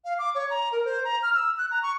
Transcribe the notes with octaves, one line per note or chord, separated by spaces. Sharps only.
F5
D6
C#5
A#5
A#4
C5
A#5
F6
E6
F#6
A#5
C#6